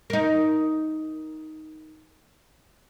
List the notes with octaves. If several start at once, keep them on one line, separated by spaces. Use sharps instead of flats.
D#4 A#4